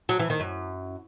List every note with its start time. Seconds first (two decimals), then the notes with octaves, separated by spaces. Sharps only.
0.09 F#3
0.19 E3
0.30 D#3
0.40 F#2